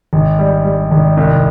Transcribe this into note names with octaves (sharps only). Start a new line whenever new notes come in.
G#1
G3
G3
G#1
C2